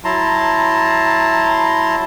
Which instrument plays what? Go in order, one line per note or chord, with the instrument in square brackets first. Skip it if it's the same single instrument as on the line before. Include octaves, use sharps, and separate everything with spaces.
[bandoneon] F#3 E4 A5 A#5 C6